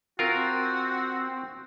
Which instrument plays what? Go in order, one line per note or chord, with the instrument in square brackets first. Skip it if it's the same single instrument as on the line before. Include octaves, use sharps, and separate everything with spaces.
[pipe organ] C4 [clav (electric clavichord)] F4 A#4 [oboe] F#4